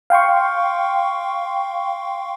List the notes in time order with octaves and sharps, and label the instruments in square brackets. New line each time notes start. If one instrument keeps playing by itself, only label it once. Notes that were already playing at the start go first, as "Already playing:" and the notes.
[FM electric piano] F5 G5 C6 C#6